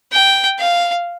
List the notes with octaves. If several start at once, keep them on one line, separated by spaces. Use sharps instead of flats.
G5
F5